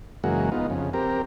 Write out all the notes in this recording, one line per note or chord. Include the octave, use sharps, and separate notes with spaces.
F#2 C#3 E3 G#3 A#3 F#4
B3 D#4 F4
F2 C#3
C4 G4 A#4